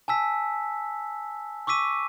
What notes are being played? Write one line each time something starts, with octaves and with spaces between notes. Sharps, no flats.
G#5 A5 E6 B6
C#6 D6 E6 B6 D#7